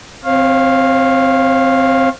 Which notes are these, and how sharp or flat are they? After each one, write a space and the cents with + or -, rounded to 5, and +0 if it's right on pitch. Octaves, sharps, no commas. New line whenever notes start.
C4 +0 C#5 -40 F5 +0